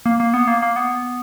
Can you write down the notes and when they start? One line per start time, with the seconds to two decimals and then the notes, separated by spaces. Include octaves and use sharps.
0.06 A#3
0.20 A#3
0.34 B3
0.47 A#3
0.62 A#3
0.76 B3